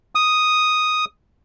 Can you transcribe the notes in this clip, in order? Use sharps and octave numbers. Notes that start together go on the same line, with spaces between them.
D#6